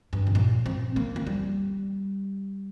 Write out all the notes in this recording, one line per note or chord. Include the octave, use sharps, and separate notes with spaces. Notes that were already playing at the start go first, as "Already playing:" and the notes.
G2
C3
A#2
C4
A#3
A#3
G3